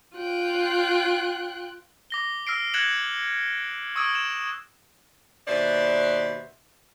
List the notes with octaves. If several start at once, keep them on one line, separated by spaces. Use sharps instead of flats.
F4 G5 F#6
D6 A#6 G7
E6 F6 A#6 C7 D7
F#6 G#6 A#6 C#7 E7 F#7
C#6 D#6 E6 G#6 D7
E7
D#2 B2 B4 C5 D5 E5